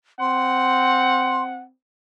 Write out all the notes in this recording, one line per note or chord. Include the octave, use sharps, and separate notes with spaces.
C4 F#5 C6